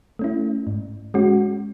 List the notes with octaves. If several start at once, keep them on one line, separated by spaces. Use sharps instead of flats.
A3 C#4 E4
G#2
G#3 C#4 F#4